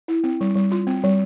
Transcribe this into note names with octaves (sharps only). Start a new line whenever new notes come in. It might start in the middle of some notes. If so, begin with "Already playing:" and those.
E4
C4
G3
G3
F4
C4
G3